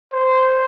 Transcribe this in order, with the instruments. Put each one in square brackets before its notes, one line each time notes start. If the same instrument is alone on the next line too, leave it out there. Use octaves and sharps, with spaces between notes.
[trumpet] C5